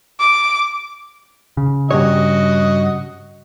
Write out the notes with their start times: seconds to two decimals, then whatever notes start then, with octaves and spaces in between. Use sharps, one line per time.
0.20 D6
1.57 C#3
1.91 G2 A#2 F#4 C#5 D#5